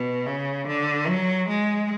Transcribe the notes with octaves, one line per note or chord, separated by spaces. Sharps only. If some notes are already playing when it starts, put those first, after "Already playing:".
Already playing: B2
C#3
D3
F#3
G#3